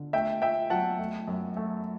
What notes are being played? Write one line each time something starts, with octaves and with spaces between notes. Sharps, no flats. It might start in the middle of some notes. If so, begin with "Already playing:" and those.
Already playing: D3
A3 E5 G5
A3 E5 G5
F#3 F#5 A5
A3
F#2
A3